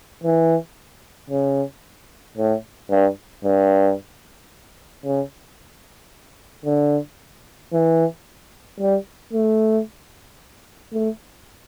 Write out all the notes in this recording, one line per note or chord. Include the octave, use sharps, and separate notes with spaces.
E3
C#3
A2
G2
G2
C#3
D3
E3
G3
A3
A3